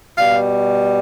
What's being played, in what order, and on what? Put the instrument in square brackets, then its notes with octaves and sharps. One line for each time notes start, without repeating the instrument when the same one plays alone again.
[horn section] B2 G3 F5